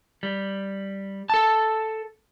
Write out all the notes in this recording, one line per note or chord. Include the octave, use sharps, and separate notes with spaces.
G3
A4 A5